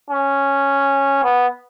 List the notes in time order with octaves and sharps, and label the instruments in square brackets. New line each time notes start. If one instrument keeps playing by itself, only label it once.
[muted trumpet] C#4
B3